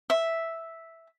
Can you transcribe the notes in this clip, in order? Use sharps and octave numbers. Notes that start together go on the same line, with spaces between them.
E5